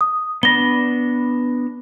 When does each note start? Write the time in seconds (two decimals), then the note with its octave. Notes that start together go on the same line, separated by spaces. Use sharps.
0.01 D#6
0.43 B3 D4 B5 A#6 G7